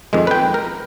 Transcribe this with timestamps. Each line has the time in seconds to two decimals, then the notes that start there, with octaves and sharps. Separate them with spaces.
0.13 F2 D#3 G#3
0.27 B4 G5
0.54 A#4